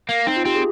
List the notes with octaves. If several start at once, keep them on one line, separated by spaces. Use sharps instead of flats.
A#3
C4 D#4
F4
C4 G4
G#4